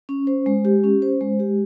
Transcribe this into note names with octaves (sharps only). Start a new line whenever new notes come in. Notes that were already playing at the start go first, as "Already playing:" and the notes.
C#4
C5
G#3
G4
C#4
C5
G#3
G4